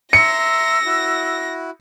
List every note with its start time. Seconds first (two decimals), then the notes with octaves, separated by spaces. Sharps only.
0.13 E5 A#5 C6 E6 A#6 C#7
0.85 E4 F#4